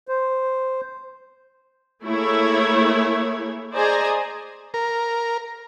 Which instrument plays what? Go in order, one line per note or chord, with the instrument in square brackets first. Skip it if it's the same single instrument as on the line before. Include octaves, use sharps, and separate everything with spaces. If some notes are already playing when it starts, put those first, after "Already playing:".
[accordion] C5
[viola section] A3 A#3 E4 G#4 C#5
G#4 C5 D5 D#5 G#5 A#5
[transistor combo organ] A#4